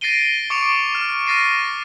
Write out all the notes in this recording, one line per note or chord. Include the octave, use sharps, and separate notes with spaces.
A6 A#6 C7 D7 D#7 G7
C#6 D6 C#7 D7 F7
F6
F6 A6 A#6 C7 D#7